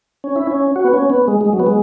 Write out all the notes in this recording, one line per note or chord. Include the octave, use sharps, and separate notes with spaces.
C#4
E4
C#4
F#4
B3
C#4
B3
G#3
G#3
F#3
B3
G#3